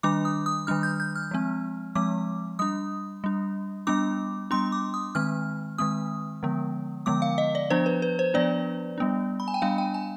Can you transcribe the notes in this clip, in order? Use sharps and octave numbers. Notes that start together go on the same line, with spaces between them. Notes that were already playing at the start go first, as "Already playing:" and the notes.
D#3 G3 D4 D6
D#6
D#6
D#3 G3 D4 F6
G6
G6
F6
F3 G#3 C4
F3 G#3 C4 D6
G3 D4 D#6
G3 D4
G3 B3 D4 D6
G3 B3 D4 C6
D6
D#6
D#3 G#3 C4 F6
D#3 G#3 C4 D#6
D3 F3 G#3 B3
D3 F3 G#3 B3 D6
F5
D#5
D5
F3 B3 D4 C5
B4
B4
C5
F3 B3 D4 D5
G3 B3 D4
B5
G#5
G5
G3 B3 D4 F5
G5
G#5